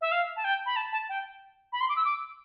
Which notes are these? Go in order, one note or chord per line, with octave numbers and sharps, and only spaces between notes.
E5
F5
A5
G5
B5
A5
A5
G5
B5
C6
D6
E6
D6